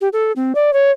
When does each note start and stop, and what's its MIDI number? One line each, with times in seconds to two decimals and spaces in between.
0.01 0.09 67
0.13 0.32 69
0.36 0.53 60
0.55 0.73 74
0.73 0.91 73